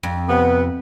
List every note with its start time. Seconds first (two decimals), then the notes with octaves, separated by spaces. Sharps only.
0.03 F2
0.29 C3 B3